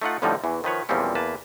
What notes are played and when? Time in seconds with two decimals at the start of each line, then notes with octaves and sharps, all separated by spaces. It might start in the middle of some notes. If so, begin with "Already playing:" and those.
0.02 A3 D#4 F4 F#5
0.22 F2 A2 D3 F3 G3 D#4
0.44 E2 E3
0.64 D#3 F3 B4 C#5
0.89 E2 A#2 F3 G3 C4 C#4
1.15 E2 A#3 B4 A5